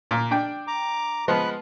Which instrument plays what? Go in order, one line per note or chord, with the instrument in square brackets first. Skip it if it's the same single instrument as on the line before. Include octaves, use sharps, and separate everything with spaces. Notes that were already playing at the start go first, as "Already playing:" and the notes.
[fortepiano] A#2
D4 G5
[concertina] A#5 D6
[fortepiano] F3 G#3 B3 [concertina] B4 F#6